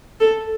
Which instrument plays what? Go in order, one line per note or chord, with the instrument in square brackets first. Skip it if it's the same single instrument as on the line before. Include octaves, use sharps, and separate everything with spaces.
[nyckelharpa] A4